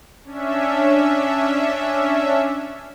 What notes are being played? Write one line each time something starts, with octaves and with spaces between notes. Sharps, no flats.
C#4 D4 E5